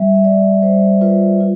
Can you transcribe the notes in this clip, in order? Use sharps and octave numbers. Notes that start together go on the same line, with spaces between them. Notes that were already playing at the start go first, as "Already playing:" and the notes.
Already playing: G3 E5
E5
G3 D5
G3 C5
F4 B4
F4